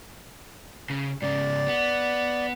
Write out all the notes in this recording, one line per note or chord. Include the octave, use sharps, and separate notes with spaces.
C#3
G#2 C#3 D5
B3